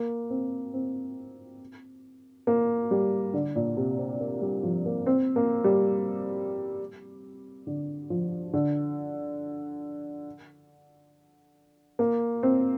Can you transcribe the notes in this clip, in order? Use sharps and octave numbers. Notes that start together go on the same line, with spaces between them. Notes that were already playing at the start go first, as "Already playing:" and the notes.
Already playing: A#3
C4
C4
A#3
G3
D3
A#2
C3
C4
A#3
G3
F3
A#3
C4
A#3
G3
D3
F3
D3
A#3
C4